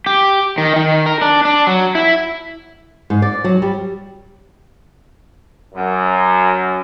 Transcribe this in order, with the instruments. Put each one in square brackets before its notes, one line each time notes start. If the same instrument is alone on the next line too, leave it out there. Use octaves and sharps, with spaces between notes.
[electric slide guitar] G4
D#3
D#3
A#4
D4
D4
F#3
E4
[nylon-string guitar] G#2
D5
F#3
G3
[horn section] F#2